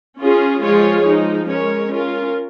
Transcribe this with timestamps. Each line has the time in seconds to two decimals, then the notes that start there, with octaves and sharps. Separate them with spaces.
0.21 C#4 F4 G#4
0.63 F3 G#3 F4 G#4 C#5
1.05 F3 G#3 D#4
1.48 G#3 C#4 A#4 C#5
1.90 C#4 F4 A#4